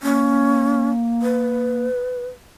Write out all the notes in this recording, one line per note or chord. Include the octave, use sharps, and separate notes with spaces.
A#3 C#4
B4